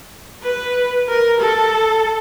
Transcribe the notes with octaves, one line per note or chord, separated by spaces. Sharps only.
B4
A#4
A4